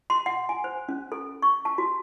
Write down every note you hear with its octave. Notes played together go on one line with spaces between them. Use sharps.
C6
F#5
G#5
C5
C#4
A4
C#6
A5
F#4